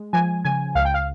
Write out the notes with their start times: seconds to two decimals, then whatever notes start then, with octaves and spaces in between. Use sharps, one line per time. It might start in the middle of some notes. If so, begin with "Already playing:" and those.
Already playing: G#3
0.13 F3 G#5
0.45 C#3 G#5
0.75 C#2 F5
0.85 G5
0.94 F5